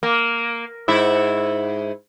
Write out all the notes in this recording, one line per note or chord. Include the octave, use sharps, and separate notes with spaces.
A#3
G#2 E4 E5